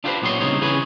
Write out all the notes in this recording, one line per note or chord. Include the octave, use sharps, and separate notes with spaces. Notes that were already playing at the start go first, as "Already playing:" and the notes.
D4 F4 G4 A4 B4 C5
B1 A#2 B3 G4 C#5 C6
C2 C#3 D#4 C5 C#5
C#3 E3 G#4 B4 C#5 G#5